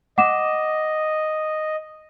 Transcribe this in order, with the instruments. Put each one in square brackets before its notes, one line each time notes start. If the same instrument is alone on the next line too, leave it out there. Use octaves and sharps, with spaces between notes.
[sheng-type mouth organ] D#5 [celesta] F#5 D6 E7